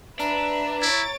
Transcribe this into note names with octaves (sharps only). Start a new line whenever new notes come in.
D4 B4 E5 A#5
E4 C#5 A6 D7